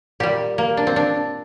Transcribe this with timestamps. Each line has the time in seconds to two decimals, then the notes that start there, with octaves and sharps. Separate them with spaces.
0.20 A#2 G3 G4
0.58 A#3
0.77 D4
0.87 C4
0.96 D4